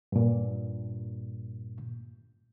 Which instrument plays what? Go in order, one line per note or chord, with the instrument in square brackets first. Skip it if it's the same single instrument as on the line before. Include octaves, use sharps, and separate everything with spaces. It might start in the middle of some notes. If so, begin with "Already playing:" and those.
[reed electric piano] G2 A#2